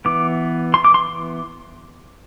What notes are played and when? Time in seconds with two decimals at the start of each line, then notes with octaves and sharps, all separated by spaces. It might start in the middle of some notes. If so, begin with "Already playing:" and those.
0.05 E3 B3 D6
0.74 C6
0.85 D6
0.94 C6